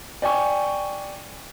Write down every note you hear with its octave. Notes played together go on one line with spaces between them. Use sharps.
D5 G5 G#5 C#6